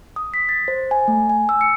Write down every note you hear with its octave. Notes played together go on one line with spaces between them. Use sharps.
D#6
B6
A6
C5
G#5
A3
G#5
E6
C#7